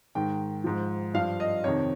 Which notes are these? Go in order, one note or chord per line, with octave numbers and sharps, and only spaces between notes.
G#2 D#3 G5
G#2 F3
G2 F3 F5
D#5
F2 C3 D#3 C#5